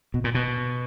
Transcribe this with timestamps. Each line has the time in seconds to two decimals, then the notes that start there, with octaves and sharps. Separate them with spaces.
0.14 B2
0.24 A#2
0.35 B2